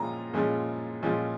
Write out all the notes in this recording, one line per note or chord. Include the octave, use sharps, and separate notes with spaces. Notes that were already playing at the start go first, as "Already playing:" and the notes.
Already playing: A#2 F3 G#3 C#4 A#5
A#2 F3 G#3 C#4
A#2 F3 G#3 C#4